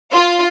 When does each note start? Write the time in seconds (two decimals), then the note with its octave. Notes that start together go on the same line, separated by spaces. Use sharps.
0.12 F4